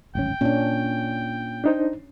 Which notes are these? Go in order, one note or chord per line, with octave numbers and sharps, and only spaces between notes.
D1 G#1 C#4 G5
A#2 C#4 D4
D4 D#4 C5